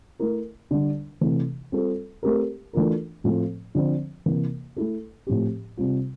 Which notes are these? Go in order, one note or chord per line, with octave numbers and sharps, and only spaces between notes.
A3 E4 A#4
D3 G3 D4
C3 E3 A3
G3 C4 F4 A4
A3 C4 G4 A#4
E3 A3 D4 F4 A#4
A2 F3 A3 C4
D3 F3 C4
C3 E3 A#3
A3 E4 A4
A2 F3 C4 G4
C3 G3 C4 F4